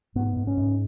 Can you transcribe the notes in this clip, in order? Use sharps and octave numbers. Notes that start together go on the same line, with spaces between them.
G#2 B3
G#2
C#4
G#2